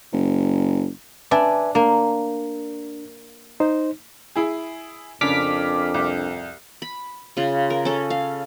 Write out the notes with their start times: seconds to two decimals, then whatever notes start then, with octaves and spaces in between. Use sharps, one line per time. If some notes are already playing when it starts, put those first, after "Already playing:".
0.13 F#1
1.31 D4 B4 E5 G#5
1.75 A#3 D4
3.60 D#4 C5
4.36 E4 G#4
5.21 F2 C#3 D4 A#4 D6 F6 B6
5.94 C2
6.82 B5
7.37 C#3 F4
7.70 A#4
7.85 C#4 A4
8.10 F5